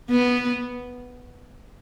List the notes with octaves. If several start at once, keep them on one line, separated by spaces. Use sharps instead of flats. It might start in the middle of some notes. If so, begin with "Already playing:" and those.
B3